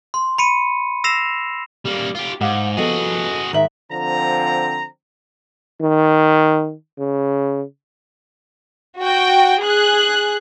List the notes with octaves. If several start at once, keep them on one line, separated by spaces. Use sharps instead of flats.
C6
B5 C#7 D#7
E6 A#6 C7 E7 F7
G3 A#3
F4 G4
G#2 F5 F#5 D6
F3 B3 F#4 G#4 A4 D#5
G#2 D#3 E5 F#7
D3 F3 C4 A#5
D#3
C#3
F#4 G5
G#4 F#6